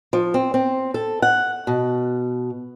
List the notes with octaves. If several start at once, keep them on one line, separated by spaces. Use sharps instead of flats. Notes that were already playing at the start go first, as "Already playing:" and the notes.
F3
C4
C4
A4
F#5
B2